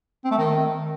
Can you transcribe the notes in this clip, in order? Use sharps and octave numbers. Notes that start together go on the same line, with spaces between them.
C4
A3
D#3